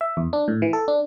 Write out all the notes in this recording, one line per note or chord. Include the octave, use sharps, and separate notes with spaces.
E5
E2
D4
A2
E3
A4
D4